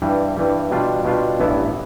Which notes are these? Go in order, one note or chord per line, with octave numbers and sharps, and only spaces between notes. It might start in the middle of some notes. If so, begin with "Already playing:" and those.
G2 E3 G3
G2 E3 G3
B2 G3 D4 F4
B2 G3 D4 F4
A1 G2 E3 B3 E4